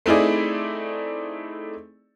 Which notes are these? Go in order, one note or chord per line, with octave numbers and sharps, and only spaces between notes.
A3 C4 D#4 E4 G#4 D5